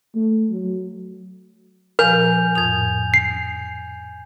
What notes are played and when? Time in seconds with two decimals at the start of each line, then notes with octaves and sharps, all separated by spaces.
0.15 A3
0.51 F#3
1.99 A#2 F3 A#4 F5 G#5 G6 F7
2.55 F2 A2 D#6 G#6 F7
3.14 C7